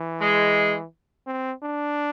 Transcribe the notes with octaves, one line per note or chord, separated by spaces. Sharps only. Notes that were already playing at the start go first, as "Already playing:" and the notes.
Already playing: E3
G#3
C4
D4